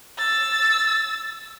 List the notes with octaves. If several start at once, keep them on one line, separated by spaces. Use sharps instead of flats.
E6 A6